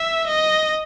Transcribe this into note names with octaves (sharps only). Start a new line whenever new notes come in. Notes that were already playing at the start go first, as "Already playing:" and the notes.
Already playing: E5
D#5